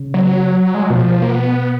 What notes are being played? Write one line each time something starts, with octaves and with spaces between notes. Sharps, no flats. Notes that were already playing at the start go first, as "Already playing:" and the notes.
Already playing: C#3
F#3
G#3
F#3
B2 F3
A#3
B3